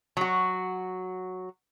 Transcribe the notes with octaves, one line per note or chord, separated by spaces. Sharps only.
F#3 F#4